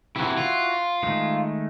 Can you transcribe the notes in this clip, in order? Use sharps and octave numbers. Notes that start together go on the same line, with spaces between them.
C3 E3 E4 F#4
F4
D#3 G#3 A3